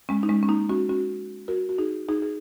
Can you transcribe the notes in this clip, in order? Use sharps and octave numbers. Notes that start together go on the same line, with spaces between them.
G#3 C#4
D#4
G#3 C#4
C#4
A#3 D#4
C#4 F#4
C#4 F#4
F#4 A#4
F#4
D#4 G#4
D#4 G#4
G#4